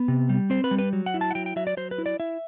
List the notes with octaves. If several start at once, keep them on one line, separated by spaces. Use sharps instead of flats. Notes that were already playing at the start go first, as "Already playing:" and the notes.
Already playing: B3
C3
G3
C4 C5
B4
G3
B4
F#3
F#5
E4
A5
F#5
F#3 G5
G5
F#3 E5
D5
F#3 C5
B4
E4
D5
E4 E5